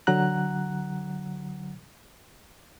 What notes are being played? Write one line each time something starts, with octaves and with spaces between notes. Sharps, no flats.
D3 F#3 F#5 A#5 F#6